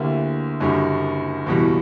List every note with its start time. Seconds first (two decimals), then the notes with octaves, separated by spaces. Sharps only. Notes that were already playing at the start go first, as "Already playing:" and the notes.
Already playing: D2 D3 A#3 E4 G4
0.60 F#1 F#2 D3 G3
1.46 F#1 E2 B2 G3